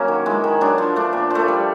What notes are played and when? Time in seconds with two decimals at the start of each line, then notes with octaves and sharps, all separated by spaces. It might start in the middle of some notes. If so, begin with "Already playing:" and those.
Already playing: F#3 A#3 C#4
0.08 D#3
0.26 G#3 B3 E4
0.44 D#3
0.61 F#3 B3 D4
0.78 F3
0.96 A3 D4
1.13 A#2
1.30 F3 A3
1.48 G3